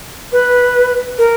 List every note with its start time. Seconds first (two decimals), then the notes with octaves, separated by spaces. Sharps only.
0.32 B4
1.18 A#4